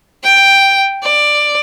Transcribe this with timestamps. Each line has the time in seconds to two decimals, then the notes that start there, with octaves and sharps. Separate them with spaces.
0.24 G5
1.03 D5